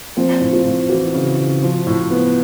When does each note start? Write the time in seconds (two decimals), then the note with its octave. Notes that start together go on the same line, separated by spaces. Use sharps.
0.17 F3 C4
0.41 A2
0.53 F4
0.65 A2
0.89 E3 F#4
1.14 C#3
1.37 C#3
1.63 F3
1.87 A2
2.10 B3